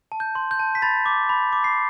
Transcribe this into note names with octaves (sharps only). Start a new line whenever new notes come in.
A5
G6
C6
G6
A5
B6
B5 A6
D6
B5
D6
C7